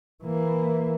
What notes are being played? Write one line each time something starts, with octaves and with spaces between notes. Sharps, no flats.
E3 A#3